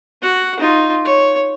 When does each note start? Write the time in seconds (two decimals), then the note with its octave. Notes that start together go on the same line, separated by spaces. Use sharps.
0.22 F#4 F#5
0.60 D#4 F4
1.05 C#5